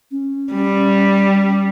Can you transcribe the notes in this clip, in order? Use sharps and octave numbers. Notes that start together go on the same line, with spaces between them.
C#4
G3